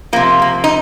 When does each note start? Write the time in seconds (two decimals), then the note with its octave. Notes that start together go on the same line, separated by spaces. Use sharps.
0.13 C3 F3 A#3
0.42 A#3
0.64 D#4